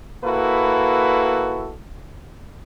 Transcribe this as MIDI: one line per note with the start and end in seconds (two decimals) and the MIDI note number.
0.24 1.73 58
0.24 1.73 64
0.24 1.73 66
0.24 1.73 69
0.24 1.73 71